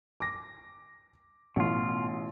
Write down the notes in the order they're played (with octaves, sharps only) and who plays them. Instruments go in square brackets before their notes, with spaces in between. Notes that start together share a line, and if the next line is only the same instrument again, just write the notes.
[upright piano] D6 A#6
[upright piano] A1 [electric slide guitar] B2 F4